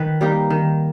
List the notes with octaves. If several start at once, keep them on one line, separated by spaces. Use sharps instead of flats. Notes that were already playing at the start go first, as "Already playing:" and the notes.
Already playing: D#3 B4
G3 A#3 D#4
D#3